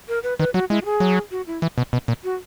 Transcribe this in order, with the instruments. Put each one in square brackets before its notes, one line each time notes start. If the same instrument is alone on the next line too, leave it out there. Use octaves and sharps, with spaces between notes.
[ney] A#4
B4
[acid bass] D#3 [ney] B4
[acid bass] F#3 [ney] F#4
[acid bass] G#3 [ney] E4
[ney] F#4
G#4
[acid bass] F#3
[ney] F#4
E4
[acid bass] E3
B2
B2
A#2
[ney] F#4